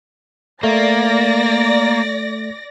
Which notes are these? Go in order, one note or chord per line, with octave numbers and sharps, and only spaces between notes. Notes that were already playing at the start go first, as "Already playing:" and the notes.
A3 A#3 D5 A#6